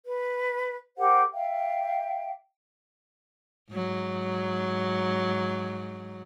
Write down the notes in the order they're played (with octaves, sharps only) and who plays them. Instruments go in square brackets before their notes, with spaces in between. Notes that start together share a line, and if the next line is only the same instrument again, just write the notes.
[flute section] B4
G4 A#4 C5 F#5
E5 F5 G5
[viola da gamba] G#2 F#3